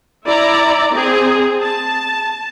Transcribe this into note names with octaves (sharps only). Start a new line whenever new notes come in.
E4 D5 A#5
C4 G#4
A5